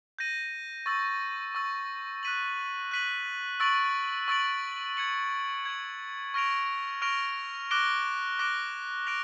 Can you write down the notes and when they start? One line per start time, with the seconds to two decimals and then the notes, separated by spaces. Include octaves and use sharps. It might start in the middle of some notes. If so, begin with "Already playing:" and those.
0.19 G6 A#6 D#7
0.86 C#6 E6 A6
1.55 C#6 E6 A6
2.23 F#6 B6 D#7 F#7
2.91 F#6 B6 D#7 F#7
3.60 C#6 E6 A6 D7 F#7
4.28 C#6 E6 A6 D7 F#7
4.97 G#6 C#7 F#7
5.65 G#6 C#7 F#7
6.34 C#6 F6 A#6 D7 F7
7.02 C#6 F6 A#6 D7 F7
7.71 D6 F#6 A#6 D7 G7
8.39 D6 F#6 A#6 D7 G7
9.07 F#6 A#6 D7 F7